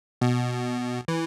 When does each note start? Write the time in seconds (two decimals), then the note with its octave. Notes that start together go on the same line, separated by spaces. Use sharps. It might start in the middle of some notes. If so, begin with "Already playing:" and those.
0.21 B2
1.08 E3